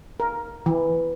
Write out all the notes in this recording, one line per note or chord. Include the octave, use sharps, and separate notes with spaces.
A#4
E3